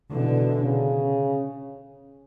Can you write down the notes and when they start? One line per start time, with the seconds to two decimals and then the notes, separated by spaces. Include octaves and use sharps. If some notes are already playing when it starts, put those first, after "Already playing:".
0.12 B2 D3 E3
0.63 C#3